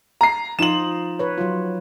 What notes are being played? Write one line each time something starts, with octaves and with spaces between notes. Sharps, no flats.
A#5 C7
F3 D#4 F4 E7 F#7
B4 C#5
F#3 F4